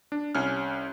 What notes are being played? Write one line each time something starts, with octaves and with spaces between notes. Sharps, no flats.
D4
C2 C#4 F6